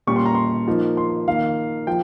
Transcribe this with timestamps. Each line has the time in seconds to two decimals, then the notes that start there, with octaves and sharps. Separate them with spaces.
0.07 A#2 G3 C#4 C#6
0.16 C6
0.26 A#5
0.35 C6
0.67 F3 A#3 D#4
0.97 C6
1.28 D#3 A#3 D#4 F5
1.87 F3 G5